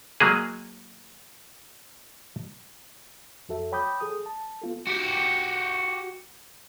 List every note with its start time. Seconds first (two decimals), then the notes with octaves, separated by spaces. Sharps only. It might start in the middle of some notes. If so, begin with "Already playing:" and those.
0.20 F#3 G#3 A#3 G#4
3.49 F2 F#4 A4 E5
3.72 C#5 G5 B5 D6 D#6 G6
4.00 G#4 A4 D#6
4.26 A5
4.62 B3 F4 A4
4.87 F#4 G4